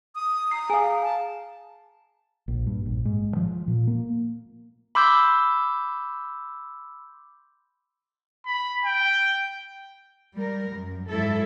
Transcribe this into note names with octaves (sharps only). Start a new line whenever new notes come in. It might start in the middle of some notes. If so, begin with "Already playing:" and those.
D#6
A#5 C7
G#4 F5 G#5
A5
A#1
G2
A#1
G#2
F3
A#2
A#3
B5 C6 D6 E6 G6
B5
G5
G3 A#4
F#2
G#2 F#3 E4 A4